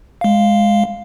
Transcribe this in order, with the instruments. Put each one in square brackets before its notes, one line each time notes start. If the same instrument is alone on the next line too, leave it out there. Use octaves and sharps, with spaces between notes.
[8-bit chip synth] G#3 F5